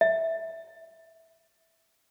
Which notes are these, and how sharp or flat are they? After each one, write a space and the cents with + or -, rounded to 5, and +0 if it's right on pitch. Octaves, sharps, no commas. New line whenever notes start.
E5 -10